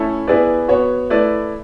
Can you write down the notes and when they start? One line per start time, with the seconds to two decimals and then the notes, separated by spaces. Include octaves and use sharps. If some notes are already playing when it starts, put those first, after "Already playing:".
Already playing: A3 C#4 E4 A4
0.28 B3 E4 G#4 B4 D5
0.68 B3 F#4 C#5
1.10 A3 E4 B4 D5